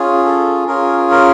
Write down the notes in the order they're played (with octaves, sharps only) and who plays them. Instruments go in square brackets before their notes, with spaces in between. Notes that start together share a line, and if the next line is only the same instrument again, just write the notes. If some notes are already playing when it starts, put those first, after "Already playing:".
Already playing: [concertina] C#4 F4 G#4
A4
C#4 F4 G#4 A#4
A#4